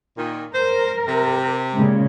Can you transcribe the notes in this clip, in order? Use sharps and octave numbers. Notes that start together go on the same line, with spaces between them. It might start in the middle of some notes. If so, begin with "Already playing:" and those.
A#2 D#3
A#4 C5
C3 G4
A#2 C#3 G#3